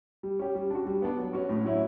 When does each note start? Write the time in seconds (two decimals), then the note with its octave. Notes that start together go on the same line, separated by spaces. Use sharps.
0.23 G3
0.39 C#4 G4
0.55 G3
0.71 D4 F#4
0.86 G3
1.02 B3 D4
1.18 F#3
1.33 C#4 F#4
1.49 A2
1.65 F#3 C#4 E4